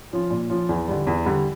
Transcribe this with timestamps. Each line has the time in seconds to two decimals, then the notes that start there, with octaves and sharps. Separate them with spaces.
0.13 F3 C#4 F4
0.31 A#2
0.50 F3 C#4 F4
0.69 E2
0.88 D3 G3
1.07 E2
1.26 D3 G3